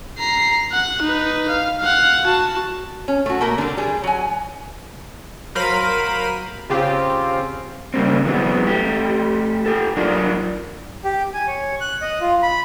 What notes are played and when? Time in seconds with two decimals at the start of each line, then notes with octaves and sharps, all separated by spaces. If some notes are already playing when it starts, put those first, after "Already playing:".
0.19 A#5 C7
0.72 F#5
1.02 D#4 B4
1.48 F5
1.80 F5 F#5
2.25 F#4 A5
3.08 C#4
3.26 A3 F#4
3.41 A3 A#3 A#4
3.58 D3 G3
3.77 G3 G#4
4.04 F#3 G#5
5.55 F#3 A#4 C5 F5 B5 D#7
6.70 C#3 C4 F4 G4
7.94 C#3 G3 A#3 C4
8.25 E3 F#3 G#3 B3 C4
8.67 A3 G4
9.66 G4 A4
9.97 F#3 D4 D#4 F4 A#4 D5
11.04 G4
11.34 G#5
11.47 C#5
11.81 F#6
12.02 D#5
12.21 F4
12.43 B5